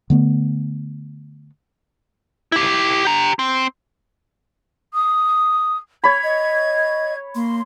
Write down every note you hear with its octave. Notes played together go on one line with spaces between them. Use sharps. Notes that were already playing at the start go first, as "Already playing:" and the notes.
D3 A3 B3
E4 G4
G4 A#5
C4
D#6
C#5 B5 G#6
D#5
A#3 C6